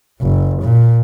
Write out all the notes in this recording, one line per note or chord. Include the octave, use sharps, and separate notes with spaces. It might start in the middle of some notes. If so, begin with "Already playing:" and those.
F#1
A#2